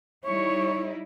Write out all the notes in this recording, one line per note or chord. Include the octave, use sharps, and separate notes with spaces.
G3 D#4 E4 C#5 C#6